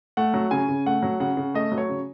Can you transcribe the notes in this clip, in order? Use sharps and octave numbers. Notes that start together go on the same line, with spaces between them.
A3 F#5
F#3
C#3 G#5
C#3
A3 F#5
F#3
C#3 F#5
C#3
A3 D#5
F#3
C#5
C#3